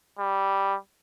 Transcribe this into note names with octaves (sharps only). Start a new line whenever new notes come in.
G3